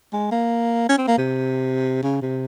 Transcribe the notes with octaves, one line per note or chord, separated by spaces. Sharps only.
G#3
A#3
C#4
C4
A#3
C3
C#3
C3